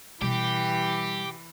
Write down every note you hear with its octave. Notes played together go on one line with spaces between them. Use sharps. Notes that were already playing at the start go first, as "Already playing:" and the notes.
B2 E3 G3 G4